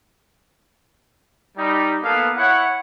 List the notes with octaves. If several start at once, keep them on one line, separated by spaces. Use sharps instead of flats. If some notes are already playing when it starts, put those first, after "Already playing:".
G3 D#4
A#3 B3 A4 F5
E4 C#5 F#5